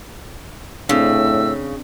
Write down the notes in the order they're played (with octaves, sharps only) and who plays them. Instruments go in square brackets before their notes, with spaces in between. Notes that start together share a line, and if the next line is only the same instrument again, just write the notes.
[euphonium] A2 [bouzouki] C#3 [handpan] C4 D4 [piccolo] E6